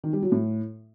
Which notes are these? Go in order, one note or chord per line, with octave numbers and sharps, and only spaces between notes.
D#3
G3
F#3
A2